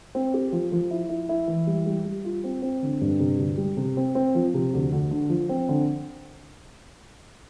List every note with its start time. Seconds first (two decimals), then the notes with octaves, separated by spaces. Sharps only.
0.15 C4
0.34 G4
0.52 F3
0.72 F3
0.91 E4
1.09 E4
1.29 E4
1.48 E3
1.67 G3
1.86 G3
2.05 G3
2.25 F4
2.44 C4
2.62 C4
2.82 D3
3.01 G2
3.19 C3
3.39 D2
3.58 G3
3.77 C3
3.97 C4
4.15 C4
4.35 F3
4.54 C3
4.73 D2
4.92 D2
5.11 D3
5.30 F3
5.49 C4
5.69 D3